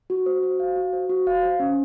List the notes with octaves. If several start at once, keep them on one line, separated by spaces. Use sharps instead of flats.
F#4
C5
F#4
F5
F#4
C5
F#4
F5
C5
C#4